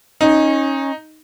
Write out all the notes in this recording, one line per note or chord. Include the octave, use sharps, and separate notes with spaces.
C#4 D#4